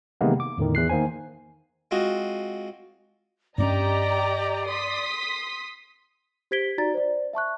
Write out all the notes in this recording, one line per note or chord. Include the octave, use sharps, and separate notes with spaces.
C3 D#3 E3 G#3 A#3 B3
D6
E2 A2 D3 D#3
E2 F#6 C7
D#3 A#3 C5 G#5
G#3 C4 F4 F#4 G#4
G2 C4 C#4 G4 D5 D#5 A#5
C6 D#6 B6
G4 C5 G#6 B6 D7 G7
D#4 F#4 D5 A#5 A6
C5 D5
E5 A5 C#6 F#6